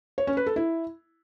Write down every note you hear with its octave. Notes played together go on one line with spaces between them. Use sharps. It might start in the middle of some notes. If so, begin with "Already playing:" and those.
C#5
C#4
B4
A4
E4